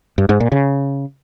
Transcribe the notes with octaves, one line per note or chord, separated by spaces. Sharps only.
G2
G#2
A#2
C#3